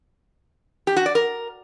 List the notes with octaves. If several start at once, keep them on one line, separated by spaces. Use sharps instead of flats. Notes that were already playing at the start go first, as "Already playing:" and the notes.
G4
F#4
D5
A#4